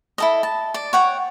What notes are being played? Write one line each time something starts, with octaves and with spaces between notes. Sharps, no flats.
E4 A4 D#5
A5
D5
C#5 F#5 G5